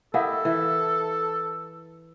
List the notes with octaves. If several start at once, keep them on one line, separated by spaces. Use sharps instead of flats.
E4 G4 A4 A#4 D#5 F5 F#5
E3 E5